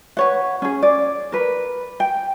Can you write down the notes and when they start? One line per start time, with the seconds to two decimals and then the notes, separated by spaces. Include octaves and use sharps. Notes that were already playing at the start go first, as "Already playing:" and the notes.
0.17 B4 C#5 F#5
0.62 C#4 G#4
0.82 D5
1.32 A#4 B4
2.00 G5